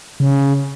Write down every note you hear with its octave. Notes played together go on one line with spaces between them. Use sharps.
C#3